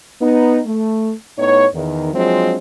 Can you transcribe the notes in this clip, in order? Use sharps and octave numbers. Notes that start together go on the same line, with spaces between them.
B3 D#4
A3
A2 B3 D#4 C#5
E2 D#3
F3 F#3 G#3 C4 D4 F4